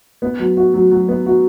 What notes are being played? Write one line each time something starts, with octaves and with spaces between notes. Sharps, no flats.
B3
F#3
F#4
F#3
F#3
B3
F#4